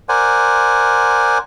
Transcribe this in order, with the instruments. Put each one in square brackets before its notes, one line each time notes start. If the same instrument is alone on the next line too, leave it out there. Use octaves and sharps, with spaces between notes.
[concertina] A#4 C5 D5 F#5 G#5